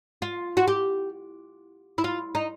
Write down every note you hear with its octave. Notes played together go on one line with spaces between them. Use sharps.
F4
F#4
G4
E4
F4
D#4